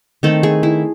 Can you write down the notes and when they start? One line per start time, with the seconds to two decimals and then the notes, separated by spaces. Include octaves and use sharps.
0.23 D#3 A3 C4 A4
0.43 G#4
0.63 E4